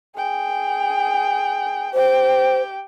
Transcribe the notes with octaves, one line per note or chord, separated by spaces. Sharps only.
G#4 G5
G4 C5 G5